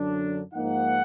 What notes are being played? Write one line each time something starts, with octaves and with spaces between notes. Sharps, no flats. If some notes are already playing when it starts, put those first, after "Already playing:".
Already playing: F#2 D3 F#3 D4
G#2 F3 A#3 D#4 F#5